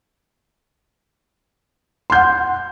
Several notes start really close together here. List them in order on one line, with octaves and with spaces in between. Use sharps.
C6 G6 F#5